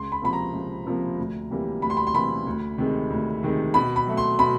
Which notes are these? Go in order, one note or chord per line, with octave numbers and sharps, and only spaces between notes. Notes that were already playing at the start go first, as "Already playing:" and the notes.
Already playing: C#2 C6
B5
C3 F3 A#3 B5
A#5
C#2
C3 F3 A#3
D2
C3 E3 G3 A#3
D2 B5
C6
B5
C6
C3 E3 G3 A#3 B5
D2
C3 D#3 G#3
D2
C3 D#3 G#3
B2 B5
B5
F#3 A3
C6
B2 B5